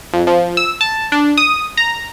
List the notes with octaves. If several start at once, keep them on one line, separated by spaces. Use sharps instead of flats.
F2
F3
E6
A5
D4
D#6
A#5